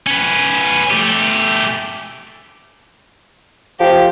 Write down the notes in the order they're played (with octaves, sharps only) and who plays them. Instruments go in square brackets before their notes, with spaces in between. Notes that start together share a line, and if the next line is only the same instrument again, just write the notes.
[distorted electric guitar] C#4 B4
A3 G4
[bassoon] F3 [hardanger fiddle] G4